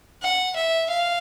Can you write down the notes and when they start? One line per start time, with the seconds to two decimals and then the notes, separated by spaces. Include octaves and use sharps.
0.22 F#5
0.56 E5
0.90 F5